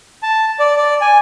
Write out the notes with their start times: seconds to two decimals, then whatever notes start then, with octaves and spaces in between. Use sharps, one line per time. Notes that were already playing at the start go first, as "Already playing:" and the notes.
0.23 A5
0.59 D5
0.76 D5
1.01 G#5